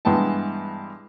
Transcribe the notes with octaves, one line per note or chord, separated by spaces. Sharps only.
G2 E3 G#3 B3 G5 A5